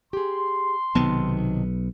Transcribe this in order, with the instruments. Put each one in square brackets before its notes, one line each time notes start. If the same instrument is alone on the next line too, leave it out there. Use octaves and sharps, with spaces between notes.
[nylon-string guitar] G4 G#4 [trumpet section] C6
[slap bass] B1 B3 [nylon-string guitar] C3 D#3 A5